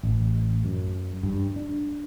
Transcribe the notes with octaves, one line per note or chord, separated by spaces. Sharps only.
A1
F#2
G2
D4